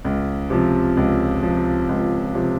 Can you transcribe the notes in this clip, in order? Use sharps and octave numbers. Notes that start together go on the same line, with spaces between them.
C#2
C3 F3
C#2
C3 F3
C#2
C3 F3